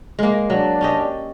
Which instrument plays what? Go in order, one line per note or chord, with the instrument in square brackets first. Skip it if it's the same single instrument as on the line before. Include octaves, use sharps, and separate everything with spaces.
[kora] G#3 A#3
[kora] F#3 [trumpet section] D4 D5
[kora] C#4 G4 D#5